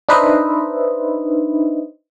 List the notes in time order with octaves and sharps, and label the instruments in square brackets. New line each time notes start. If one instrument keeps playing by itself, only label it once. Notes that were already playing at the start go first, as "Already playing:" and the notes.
[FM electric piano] D4 D#4 B4 C5 D#5 E5